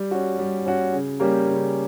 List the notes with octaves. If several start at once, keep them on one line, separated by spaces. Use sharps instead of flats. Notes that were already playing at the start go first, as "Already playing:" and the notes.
Already playing: G3
C#4 F#4
G3
C#4 F#4
C#3
G3 A#3 C#4 G4
C#3